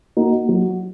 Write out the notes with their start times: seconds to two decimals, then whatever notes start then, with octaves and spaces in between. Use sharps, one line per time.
0.17 A#3 D#4 F#4
0.49 F#3